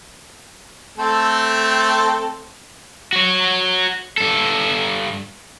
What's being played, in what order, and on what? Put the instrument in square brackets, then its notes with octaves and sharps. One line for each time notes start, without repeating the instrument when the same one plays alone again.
[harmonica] A3 C4 A4
[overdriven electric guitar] F#4 C#5
G2 A4